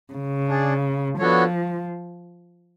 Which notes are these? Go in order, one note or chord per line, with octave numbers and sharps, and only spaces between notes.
C#3
D4 G#4 D5
F3 B3 D4 F#4 A4 C#5